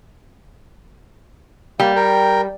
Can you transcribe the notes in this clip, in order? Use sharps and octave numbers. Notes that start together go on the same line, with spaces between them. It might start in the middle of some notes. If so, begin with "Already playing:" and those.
G3 A#3
A#4 G5